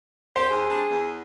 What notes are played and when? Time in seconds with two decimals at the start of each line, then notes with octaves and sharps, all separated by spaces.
0.36 G4 C5
0.50 D#2 G#4
0.69 G3 C4 D4
0.90 E2